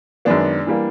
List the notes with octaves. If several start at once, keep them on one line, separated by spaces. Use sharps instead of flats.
F#2 D#3 G#3 B3 D4
E3 G3 A#3